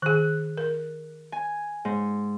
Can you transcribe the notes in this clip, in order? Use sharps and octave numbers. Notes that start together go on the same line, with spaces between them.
D#3 G#4 F#6
A#4
G#5
G#2